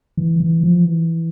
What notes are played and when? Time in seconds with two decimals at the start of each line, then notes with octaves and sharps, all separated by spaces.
0.17 E3
0.40 E3
0.63 F3
0.85 E3